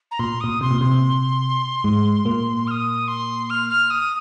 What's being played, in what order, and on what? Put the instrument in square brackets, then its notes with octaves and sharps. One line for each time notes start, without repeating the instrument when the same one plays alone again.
[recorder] A#5
[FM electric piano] A#2 [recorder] C6
[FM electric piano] A#2 [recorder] D#6
[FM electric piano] C3 [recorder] C6
[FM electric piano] A#2
[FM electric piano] C3 [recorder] C6
[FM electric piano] G#2 G#3
A#2 A#3
[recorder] F6
D#6
C6
F6
F6
D#6